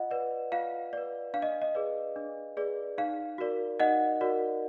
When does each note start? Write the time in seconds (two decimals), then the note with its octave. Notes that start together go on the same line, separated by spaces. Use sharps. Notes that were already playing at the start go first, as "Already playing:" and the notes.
Already playing: F4 D#5 F#5
0.11 B4 D5
0.52 F4 F5
0.93 B4 D5
1.34 D4 F5
1.42 D#5
1.62 D#5
1.75 G#4 B4 D5
2.16 D4
2.57 G#4 B4 D5
2.98 D#4 F5
3.38 F#4 A#4 D5
3.80 D#4 D#5 F#5
4.21 F#4 A#4 D5